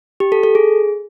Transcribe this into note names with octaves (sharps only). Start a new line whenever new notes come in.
G4
A4
A4
G#4